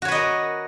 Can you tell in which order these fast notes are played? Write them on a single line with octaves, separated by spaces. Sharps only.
F#4 C#5 B4 D#5 A#4